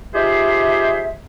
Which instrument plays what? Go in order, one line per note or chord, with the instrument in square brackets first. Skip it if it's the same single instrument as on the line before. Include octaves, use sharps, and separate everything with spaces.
[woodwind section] D#4 F4 G4 G#4 C5 E5